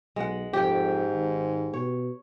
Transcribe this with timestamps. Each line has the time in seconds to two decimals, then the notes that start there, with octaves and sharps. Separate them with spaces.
0.16 B1 G#3 F#5
0.53 F2 G#2 G4 G5
1.12 G#1
1.74 B2 C#5